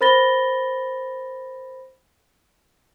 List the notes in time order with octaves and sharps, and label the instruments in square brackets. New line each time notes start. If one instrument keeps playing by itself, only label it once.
[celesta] A#4 C5 B5 A6 A#6 G7